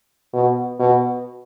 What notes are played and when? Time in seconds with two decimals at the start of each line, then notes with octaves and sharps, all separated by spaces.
0.34 B2
0.80 B2